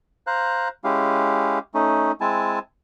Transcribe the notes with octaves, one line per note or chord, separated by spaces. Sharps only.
C5 F5 A#5 F#6
G#3 C#4 E4 G4 F5
A3 C#4 D#4
G#3 C4 E4 G#5 A5